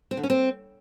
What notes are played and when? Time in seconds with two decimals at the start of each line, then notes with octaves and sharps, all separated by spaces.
0.11 C4
0.17 D3
0.23 C#4
0.30 C4